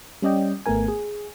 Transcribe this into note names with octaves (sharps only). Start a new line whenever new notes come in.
G3 C#4 D5 D#5 G5
G#1 A3 B3 A#4 G#5
G#4